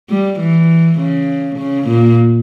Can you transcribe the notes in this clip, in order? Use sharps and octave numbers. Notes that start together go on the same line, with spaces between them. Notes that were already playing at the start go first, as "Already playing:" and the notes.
G3
E3
C#3
C#3
A#2